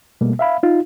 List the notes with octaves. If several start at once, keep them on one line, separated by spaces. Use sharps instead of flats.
B2 G3 A3 A#3
E5 F5 B5
D#4 F4